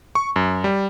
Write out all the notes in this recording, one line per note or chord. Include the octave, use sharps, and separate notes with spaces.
C#6
F#2
G3